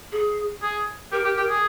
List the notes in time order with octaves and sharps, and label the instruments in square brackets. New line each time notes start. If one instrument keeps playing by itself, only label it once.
[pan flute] G#4
[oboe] G#4
[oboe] G4 [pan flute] A#4
[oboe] G4
G4
G#4